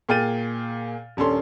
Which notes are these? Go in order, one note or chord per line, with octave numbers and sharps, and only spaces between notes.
A#2 G#4 G5 F6 A6 D#7
D#1 C#4 D4 A4 C6